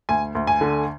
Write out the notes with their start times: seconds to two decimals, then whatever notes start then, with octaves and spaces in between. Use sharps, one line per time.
0.09 D2 G#5
0.35 D2
0.47 G#5
0.61 D3